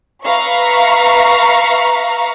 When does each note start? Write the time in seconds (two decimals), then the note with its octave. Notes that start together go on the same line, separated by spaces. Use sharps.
0.24 B4 E5 F5 A#5 C#6